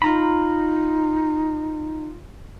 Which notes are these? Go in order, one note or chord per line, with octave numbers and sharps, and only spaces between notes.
D#4 F4 A#5 B5